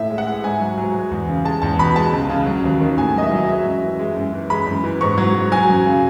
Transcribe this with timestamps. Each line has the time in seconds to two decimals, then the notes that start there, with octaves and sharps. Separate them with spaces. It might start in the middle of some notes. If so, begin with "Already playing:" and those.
Already playing: A2 E5
0.10 G#3
0.18 F#5
0.27 G#3
0.44 G#2 G#5
0.60 F#3
0.78 F#3
0.94 G#3
1.11 E2
1.28 C#3
1.45 G#3 A5
1.62 E2 A5
1.79 B2 B5
1.96 G#3 A5
2.13 C#2
2.30 C#3
2.46 F#3
2.64 D#2
2.81 D#3
2.98 A2 G#5
3.15 F#3 D#5
3.23 E5
3.31 F#3
3.49 G#3 E5
3.66 F#2
3.82 E3
3.99 G#3
4.16 F#2
4.33 E3
4.50 G#3 B5
4.67 F#2
4.84 E3
5.01 G#2 C#6
5.18 F#3
5.35 F#3
5.52 F#3 G#5
5.69 F#2
5.86 C#3